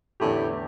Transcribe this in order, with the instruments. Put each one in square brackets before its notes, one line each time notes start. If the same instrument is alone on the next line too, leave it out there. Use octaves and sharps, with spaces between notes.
[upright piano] E2 D3 A3 E4 G4 [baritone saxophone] A2